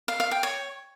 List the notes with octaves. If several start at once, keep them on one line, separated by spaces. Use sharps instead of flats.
F5
F5
G5
C#5